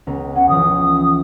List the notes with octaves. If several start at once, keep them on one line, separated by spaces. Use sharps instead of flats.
C#2 B3 A#5
C#4 G#4 F#5
C#2 E3 F3 D#6